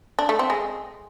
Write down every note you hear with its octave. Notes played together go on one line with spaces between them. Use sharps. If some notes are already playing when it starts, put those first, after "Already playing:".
D4
A3
C4
G#3